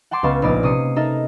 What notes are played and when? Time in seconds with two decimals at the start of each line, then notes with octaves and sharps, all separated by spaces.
0.11 F#5 G5 A5 C6 D6
0.23 C#2 B3 F5 A5 C#6
0.42 A#1 B3 D#4 D5
0.63 C3 C#4 D#6 C7 C#7
0.96 D#4 A4 A#4 E5